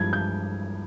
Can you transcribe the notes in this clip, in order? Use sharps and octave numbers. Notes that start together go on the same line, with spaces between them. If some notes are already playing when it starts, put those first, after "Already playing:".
Already playing: G2 F3 G#3 E4 G#6
G6